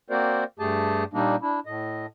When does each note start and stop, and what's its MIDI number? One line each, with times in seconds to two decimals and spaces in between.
0.10 0.44 58
0.10 0.44 60
0.10 0.44 66
0.10 0.44 70
0.10 0.44 72
0.10 0.44 74
0.59 1.04 43
0.59 1.04 57
0.59 1.04 67
0.59 1.04 68
0.59 1.04 81
1.13 1.36 46
1.13 1.36 55
1.13 1.36 58
1.13 1.36 62
1.13 1.36 63
1.42 1.60 62
1.42 1.60 64
1.66 2.06 45
1.66 2.06 75